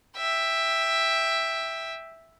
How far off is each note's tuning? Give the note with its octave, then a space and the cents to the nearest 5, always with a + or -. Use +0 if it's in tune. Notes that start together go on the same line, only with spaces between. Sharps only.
E5 +0 G5 +15